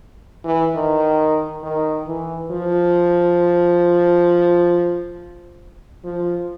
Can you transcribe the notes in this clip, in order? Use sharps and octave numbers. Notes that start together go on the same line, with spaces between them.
E3
D#3
D#3
E3
F3
F3